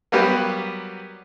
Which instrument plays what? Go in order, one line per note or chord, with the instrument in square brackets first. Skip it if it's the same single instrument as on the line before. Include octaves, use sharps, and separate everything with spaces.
[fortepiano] F#3 G3 A#3 B3 G4 B4